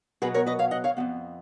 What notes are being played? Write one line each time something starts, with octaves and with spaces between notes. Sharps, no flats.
B2 F#3 B3 G#4 B4
A#4 C#5
B4 D#5
C#5 F5
D#5 F#5
C#5 F5
F2 F3 B3